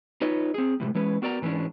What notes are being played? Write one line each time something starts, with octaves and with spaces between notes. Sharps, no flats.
D#4 F4 B4 C#5 D#5
C4 G#4
A2 C3 F3 G#3
E3 G#3 C#4 B4
B3 F#4 A#4 D5 G5 A#5
G#2 E3 G#3 C#4 D4